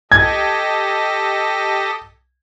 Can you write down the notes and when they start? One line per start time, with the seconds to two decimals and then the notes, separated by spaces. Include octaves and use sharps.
0.12 G4 A4 D#5 G#6